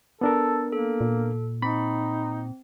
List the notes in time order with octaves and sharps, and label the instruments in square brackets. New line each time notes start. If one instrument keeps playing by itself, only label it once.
[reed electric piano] B3 D4 A#4 [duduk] A4
[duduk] A#3 [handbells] A4
[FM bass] A#2
[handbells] C4 [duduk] D#4 [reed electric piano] B5